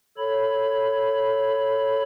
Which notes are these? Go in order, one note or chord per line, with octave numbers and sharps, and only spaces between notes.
A4 C#5 B5